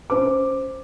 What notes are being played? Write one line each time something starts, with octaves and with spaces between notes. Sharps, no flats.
C#4 C5 D6